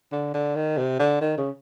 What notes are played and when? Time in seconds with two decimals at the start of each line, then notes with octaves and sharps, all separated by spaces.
0.12 D3
0.34 D3
0.56 D#3
0.78 C3
0.99 D3
1.21 D#3
1.38 C#3